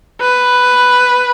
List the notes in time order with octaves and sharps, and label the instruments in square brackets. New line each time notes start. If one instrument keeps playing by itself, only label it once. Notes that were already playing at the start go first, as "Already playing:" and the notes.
[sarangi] B4